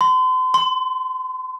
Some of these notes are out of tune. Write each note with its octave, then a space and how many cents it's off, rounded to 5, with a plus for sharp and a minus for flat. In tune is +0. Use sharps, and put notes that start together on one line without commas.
C6 -40
C6 -5